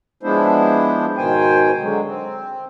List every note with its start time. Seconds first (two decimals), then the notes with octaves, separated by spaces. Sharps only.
0.23 F3 G#3 B3 D4 E4 C5
1.17 G#2 B2 D#3 C5 G5 G#5
1.81 D3 F#3 G#3
2.06 C4